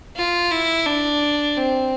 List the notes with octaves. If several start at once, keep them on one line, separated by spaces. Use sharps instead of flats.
F4
E4
D4
C4